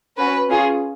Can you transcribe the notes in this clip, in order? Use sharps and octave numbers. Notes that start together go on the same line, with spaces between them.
C#4 F#4 B4
C#4 F4 G#4